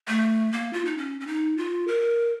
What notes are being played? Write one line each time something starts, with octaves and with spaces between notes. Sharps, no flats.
A3
A#3
F4
D#4
C#4
C#4
D#4
F4
A#4